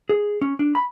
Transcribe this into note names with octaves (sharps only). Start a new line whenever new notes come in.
G#4
C#4
D4
B5